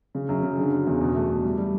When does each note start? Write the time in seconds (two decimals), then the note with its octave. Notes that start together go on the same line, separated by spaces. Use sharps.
0.15 C#3
0.29 F#2
0.43 C#3
0.57 D3
0.72 F#3
0.87 E2
1.01 B2
1.15 A3
1.30 A3
1.44 G3
1.58 G3